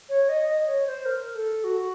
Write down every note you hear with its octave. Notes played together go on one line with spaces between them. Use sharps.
C#5
D#5
D#5
C#5
C5
A#4
A4
F#4